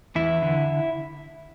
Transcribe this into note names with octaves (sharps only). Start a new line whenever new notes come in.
E2 E4
D3